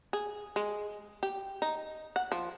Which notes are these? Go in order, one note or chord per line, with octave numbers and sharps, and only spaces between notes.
G#4
G#3
G4
D#4
F#5
F3